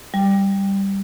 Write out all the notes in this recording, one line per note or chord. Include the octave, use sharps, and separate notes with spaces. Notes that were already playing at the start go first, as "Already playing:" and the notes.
G3